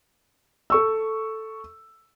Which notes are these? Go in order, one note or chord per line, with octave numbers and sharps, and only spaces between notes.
A4 C#6 E6